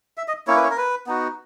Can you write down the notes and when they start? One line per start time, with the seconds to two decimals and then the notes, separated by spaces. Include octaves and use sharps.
0.18 E5
0.28 D#5
0.47 A#3 C#4 E4 C#5
0.56 B4
0.64 C#5
0.71 A#4
0.77 B4
1.07 B3 D#4 F#4